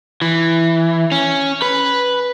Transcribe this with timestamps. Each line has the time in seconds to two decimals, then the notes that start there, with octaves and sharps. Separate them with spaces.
0.22 E3
1.12 C#4
1.62 B4